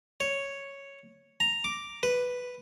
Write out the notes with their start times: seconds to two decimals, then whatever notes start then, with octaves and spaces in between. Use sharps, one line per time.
0.20 C#5
1.40 A#5
1.64 D6
2.03 B4